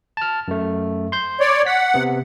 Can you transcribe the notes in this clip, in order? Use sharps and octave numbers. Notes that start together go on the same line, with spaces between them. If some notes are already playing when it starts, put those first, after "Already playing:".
A5 F6
F#2 A3
C6 G6
C#5 D5
F#5 B6
C3 B3